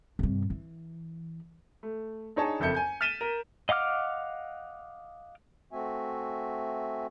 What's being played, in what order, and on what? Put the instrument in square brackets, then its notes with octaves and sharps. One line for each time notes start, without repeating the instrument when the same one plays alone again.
[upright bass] G2 C3
E3
[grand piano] A3
D4 D#4 G#4 C#5 D#5 A5
F#1 F2 A4 E5 G6 C#7
G#5 G6
F6 A6 B6 D#7 E7 G7
A#4
[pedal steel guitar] D#5 F5 F#5 D6 F6
[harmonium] A3 C4 F#4 E5 G#5